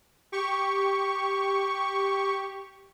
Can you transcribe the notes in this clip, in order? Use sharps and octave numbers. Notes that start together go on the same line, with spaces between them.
G4 C#6